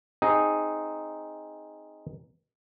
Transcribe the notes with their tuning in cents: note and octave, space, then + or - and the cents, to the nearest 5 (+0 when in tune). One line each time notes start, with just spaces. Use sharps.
C4 +0 D#4 +0 G#4 +0